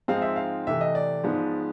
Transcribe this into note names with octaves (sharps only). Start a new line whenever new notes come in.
G#2 F3 G#3 C4 D#4 F5
E5
F5
C3 E3 A3 E5
D#5
D5
G#2 F3 G#3 B3